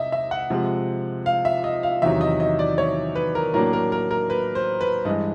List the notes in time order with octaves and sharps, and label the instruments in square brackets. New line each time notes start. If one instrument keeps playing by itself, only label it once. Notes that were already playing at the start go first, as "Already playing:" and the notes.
Already playing: [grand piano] C3 D#5 E5
E5
F#5
C3 F3 G#3
F5
E5
D#5
F5
E2 C3 D#3 F#3 E5
D#5
D#5
D5
C#5
B4
A#4
A2 F#3 A#3 D4 A#4
A#4
A#4
A#4
B4
C5
B4
G2 E3 G#3 D#5